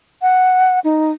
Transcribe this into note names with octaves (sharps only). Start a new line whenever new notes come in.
F#5
D#4